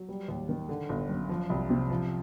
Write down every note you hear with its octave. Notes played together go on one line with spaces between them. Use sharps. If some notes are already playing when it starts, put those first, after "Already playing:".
Already playing: F#3
G3
D#2
D#3
D3
G1
F#2
F3
C2
C3
F3